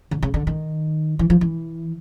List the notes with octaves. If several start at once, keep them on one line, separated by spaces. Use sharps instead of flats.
D3
C#3
D3
D#3
E3
F3
E3